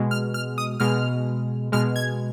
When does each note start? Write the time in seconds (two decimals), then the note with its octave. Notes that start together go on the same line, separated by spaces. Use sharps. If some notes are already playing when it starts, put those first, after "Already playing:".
Already playing: B2 G#3
0.11 F6
0.34 F6
0.58 D#6
0.80 B2 G#3 F6
1.72 B2 G#3 F6
1.96 G#6